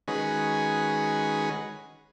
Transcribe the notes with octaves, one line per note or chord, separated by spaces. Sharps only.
D#3 G#3 C#4 F#4 G#4 B4